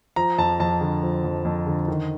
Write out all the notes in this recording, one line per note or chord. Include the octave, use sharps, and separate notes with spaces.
F3 A#5
F2 A5
F2 A5
D3
F3
F2
F2
D3
D#3